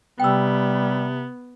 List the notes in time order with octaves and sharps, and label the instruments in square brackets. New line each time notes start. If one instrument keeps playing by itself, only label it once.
[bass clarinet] C3 [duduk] G3 [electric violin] B3 [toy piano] G5 E6